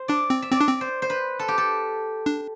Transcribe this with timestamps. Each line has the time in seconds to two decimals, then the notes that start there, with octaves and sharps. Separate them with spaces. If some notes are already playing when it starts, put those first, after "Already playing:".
Already playing: C5
0.08 D4 D5
0.30 C4
0.42 E5
0.52 C4 D5
0.61 D4
0.67 C4
0.81 C5
1.02 C5
1.10 B4
1.39 A4
1.48 G4
1.58 A4
2.26 D4